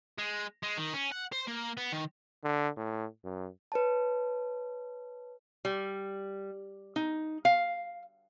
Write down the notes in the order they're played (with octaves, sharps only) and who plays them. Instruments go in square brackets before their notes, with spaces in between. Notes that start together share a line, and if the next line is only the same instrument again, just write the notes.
[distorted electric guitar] G#3
G#3
D#3
C#4
F#5
C5
A#3
B3
D#3
[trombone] D3
A2
F#2
[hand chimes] B4 C#5 A5
[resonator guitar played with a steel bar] G3
D#4
F5